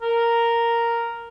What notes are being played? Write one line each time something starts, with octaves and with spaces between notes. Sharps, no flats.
A#4